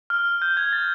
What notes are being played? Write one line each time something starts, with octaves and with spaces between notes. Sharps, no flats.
F6
G6
G#6
A6